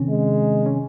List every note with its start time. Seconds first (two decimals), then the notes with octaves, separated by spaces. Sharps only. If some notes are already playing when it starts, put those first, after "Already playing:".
Already playing: C3 D#3 C4 C#4
0.09 G#3
0.66 C#4